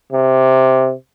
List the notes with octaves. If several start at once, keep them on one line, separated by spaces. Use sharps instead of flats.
C3